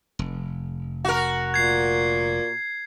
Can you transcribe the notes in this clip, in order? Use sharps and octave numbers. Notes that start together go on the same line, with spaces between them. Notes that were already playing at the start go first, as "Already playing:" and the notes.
F1
F#4 A#4
A#2 G#6 C7